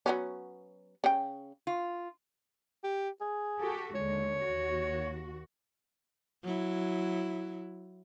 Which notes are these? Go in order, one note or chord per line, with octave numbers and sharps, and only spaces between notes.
F#3 B3 C#4
C#3 G5
F4
G4
G#4
F#4 G4 A4
D#2 D3 G#3 C#5
D#2 F#4
F#3 E4